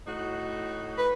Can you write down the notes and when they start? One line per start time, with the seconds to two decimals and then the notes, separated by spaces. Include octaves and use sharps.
0.07 A2 D#4 F#4
0.98 B4